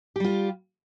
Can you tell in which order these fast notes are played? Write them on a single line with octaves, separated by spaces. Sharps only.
G4 G3 F4